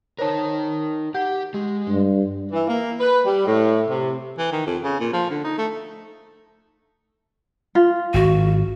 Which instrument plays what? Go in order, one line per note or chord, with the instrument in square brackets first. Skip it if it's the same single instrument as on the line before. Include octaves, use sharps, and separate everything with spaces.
[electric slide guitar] D#4 A#4 [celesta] C5 C#5 A5
[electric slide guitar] G4 [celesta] F#5 G6
[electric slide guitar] G#3 [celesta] G4
[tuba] G2
[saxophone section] E3
A#3
B4
G3
A2
C3
[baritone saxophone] E3
D#3
F2
C#3
A#2
F3
D3
D#4
A3
[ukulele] F4
[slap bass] G#1 [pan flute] F#4